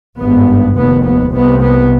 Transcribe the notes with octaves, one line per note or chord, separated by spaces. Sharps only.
G#1 G2 B3
F1 D#2 B3
B3
C2 C3 B3
B3